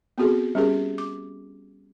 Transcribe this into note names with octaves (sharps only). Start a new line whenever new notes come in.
B3 C4 F#4 G#4 A4
G3 C#4 G4 G#4 A#4
D6